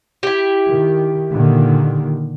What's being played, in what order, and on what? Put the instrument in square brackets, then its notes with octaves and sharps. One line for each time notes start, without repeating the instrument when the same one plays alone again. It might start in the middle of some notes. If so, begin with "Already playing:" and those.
[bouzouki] E4 G4
[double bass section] D#3
A#2 D3 D#3